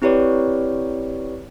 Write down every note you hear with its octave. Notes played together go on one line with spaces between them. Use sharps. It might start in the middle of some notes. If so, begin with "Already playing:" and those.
C4 E4 G4 B4 C#5 D5